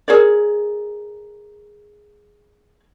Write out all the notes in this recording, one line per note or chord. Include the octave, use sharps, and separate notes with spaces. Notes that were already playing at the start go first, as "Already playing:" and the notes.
G#4 A#4 C#5 D5